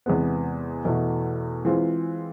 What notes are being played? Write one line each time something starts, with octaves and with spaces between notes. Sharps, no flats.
E2 C3 G#3 B3
E2 B2 A3 E4
E3 G#3 C4 F4